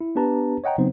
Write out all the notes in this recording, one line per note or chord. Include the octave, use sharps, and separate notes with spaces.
E4
B3 D4 G4 B4 A5 A#5
C#5 D#5 F#5 G5 A#5
C#3 F#3 B3 C4 D#4 C5